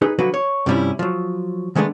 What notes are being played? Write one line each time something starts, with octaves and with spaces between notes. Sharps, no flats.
D#4 G#4 B4
D3 F3 F#3 F#4 B4
C#5
G2 C3 F3 G3 C#4 E4
F3 F#3
D#3 G#3 A3 B3 D4